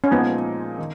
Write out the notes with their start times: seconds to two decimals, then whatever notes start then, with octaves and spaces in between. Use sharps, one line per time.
0.04 C#4
0.11 A#2 F3 G#3 B3 D#4
0.78 D#3